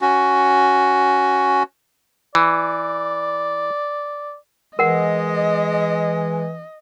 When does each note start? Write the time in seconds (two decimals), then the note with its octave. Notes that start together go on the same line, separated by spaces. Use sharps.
0.01 C#4 F#4
2.35 E3 D5
4.79 E3 G#3 A#4 D#5 F#5